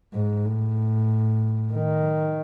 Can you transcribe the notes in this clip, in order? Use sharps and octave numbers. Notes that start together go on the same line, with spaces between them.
G#2
A2
D#3